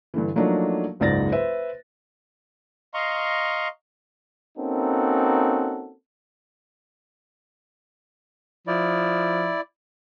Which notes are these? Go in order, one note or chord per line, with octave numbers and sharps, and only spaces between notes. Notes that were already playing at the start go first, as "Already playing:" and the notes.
G2 D3 E3
F3 F#3 A3 A#3 D4 D#4
F#1 C#2 G#2 D5 A6 A#6
B4 C5 E5
D#5 F5 A#5 C6 C#6
A#3 C4 C#4 D#4 F#4 A4
F3 E4 D5